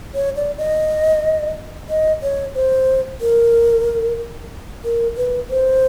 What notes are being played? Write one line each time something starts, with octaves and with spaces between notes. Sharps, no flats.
C#5
D5
D#5
D#5
C#5
C5
A#4
A#4
B4
C5